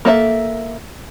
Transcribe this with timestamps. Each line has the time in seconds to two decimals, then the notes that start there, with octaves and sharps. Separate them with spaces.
0.05 A#3 A4 D#5 E5